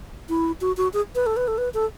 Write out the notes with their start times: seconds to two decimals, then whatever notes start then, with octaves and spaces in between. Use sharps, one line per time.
0.29 E4
0.61 F#4
0.77 F#4
0.93 G#4
1.15 B4
1.26 A4
1.37 B4
1.48 A4
1.58 B4
1.74 A4